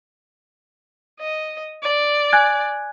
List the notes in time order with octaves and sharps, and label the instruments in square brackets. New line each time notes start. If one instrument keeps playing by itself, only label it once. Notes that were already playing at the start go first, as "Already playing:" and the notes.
[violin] D#5
D5
[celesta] G#5 F#6 G#6